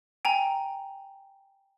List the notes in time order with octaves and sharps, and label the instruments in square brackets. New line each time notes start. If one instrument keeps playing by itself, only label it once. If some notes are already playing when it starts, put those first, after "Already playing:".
[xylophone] G5 G#5 A#5